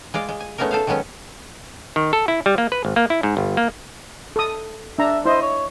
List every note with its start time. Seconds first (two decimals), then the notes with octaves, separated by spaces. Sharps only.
0.14 G#3 F4 D5
0.29 G#3
0.40 G#5
0.58 G#3 A3 B3 C#4 D#4 A#4
0.71 A4 C5 F5
0.87 D#3 F#3 G#3 B3 C#4
1.96 D#3
2.13 A4
2.28 E4
2.46 G3
2.58 A#3
2.72 B4
2.85 G#1
2.96 A#3
3.10 E4
3.23 G#2
3.37 G1
3.57 A#3
4.36 A4 D#6
4.99 D4 E5 A#5
5.25 E4 C5 D#5
5.42 C#5